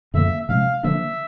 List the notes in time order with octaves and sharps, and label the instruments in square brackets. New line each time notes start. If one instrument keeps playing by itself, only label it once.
[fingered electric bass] F#2 D3 F3 A#3 [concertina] E5
[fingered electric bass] C3 F3 G#3 C#4 [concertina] F5
[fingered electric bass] D3 F3 A#3 D4 [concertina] E5